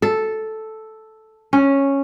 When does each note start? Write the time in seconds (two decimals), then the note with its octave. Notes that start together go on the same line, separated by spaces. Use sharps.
0.02 A4
1.53 C#4